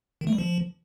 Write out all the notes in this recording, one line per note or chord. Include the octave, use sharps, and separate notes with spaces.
D#3
A3
G3
F3